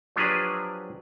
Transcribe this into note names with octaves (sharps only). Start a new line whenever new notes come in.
F3 F#3 D4 G4 G#4 B4